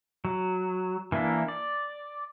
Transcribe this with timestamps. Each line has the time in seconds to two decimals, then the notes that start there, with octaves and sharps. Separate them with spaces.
0.25 F#3
1.12 E3 A#3 D4 E4
1.48 D5